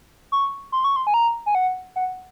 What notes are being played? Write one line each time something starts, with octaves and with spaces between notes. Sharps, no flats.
C#6
C6
C#6
C6
G#5
A#5
G#5
F#5
F#5